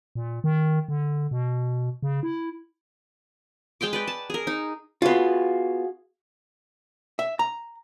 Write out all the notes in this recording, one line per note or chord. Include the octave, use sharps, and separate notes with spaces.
A#2
D#3
D3
B2
C#3
E4
G#3 G5 C6 D6
B4 D5 G5
A5
G#4 A#4
D#4
B3 F4 F#4 G#4 F5
E5
A#5